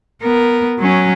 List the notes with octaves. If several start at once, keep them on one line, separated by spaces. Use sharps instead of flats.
B3 A#4
F#3 C#4